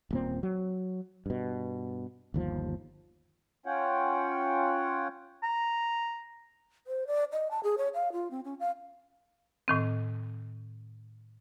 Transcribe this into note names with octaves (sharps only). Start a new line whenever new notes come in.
D#1 A#2 C4
F#3
G2 B2
G1 D#2 F3
C#4 F4 C#5 F#5 G5
A#5
C5
D5
D#5
A5
G#4
C#5
F5
F4
C4
C#4
F5
A2 D#3 C4